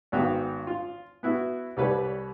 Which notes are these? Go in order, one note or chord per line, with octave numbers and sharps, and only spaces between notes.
G#1 B3 F#4 F5 G5
F4
B3 E4 F#4
C2 G3 B4 C#5